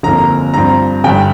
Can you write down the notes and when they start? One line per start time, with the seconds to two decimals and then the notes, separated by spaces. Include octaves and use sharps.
0.03 G1 F2 F3 A#3 A#5
0.54 G2 F3 C4 A#5
1.04 G1 G2 G3 G5